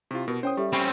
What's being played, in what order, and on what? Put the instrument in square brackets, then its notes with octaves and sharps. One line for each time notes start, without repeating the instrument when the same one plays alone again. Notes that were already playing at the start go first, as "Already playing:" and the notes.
[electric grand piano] C3 F4 [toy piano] E4 G4
[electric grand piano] B2 [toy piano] A#4
[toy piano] C#4 C#5 F#5 [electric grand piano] C5 G5 D#6
[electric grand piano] G3 [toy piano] G4 A4 E5
[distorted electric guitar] C4 C#4 [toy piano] B5 C#6